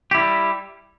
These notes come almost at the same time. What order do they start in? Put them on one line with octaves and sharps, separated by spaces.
G4 E4 G3